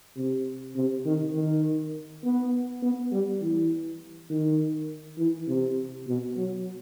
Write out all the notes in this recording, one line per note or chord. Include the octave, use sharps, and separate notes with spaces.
C3
C3
D#3
D#3
B3
B3
G3
E3
D#3
E3
C3
B2
F#3